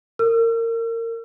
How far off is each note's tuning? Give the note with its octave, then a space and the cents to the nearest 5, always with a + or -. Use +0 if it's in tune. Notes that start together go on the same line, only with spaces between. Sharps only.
A#4 -25 E6 +45